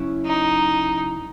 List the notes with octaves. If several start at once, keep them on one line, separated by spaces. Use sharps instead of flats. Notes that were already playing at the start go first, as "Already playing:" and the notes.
Already playing: C#3 F#3 C#4 E4
D#4